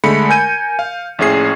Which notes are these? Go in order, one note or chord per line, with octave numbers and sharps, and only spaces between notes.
D3 G#3 A3 B5 C#7
A#4 G#5 G6 D#7
F5
A#1 A2 C#4 G#4 C7